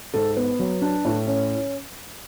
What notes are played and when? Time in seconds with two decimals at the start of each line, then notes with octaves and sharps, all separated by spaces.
0.14 G#2 A4
0.37 B3 B4
0.59 F#3
0.82 D4
1.05 A2
1.27 C#4